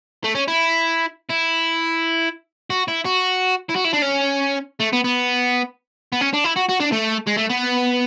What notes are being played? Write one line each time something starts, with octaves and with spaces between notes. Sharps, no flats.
A3
C#4
E4
E4
F#4
E4
F#4
E4
F#4
E4
D4
C#4
A3
B3
B3
B3
C#4
D4
E4
F#4
F#4
D4
A3
G#3
A3
B3